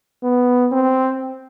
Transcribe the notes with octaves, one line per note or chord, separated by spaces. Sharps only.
B3
C4